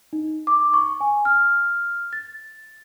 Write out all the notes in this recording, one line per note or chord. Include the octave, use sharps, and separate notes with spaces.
D#4
D6
C#6
G#5
F6
A6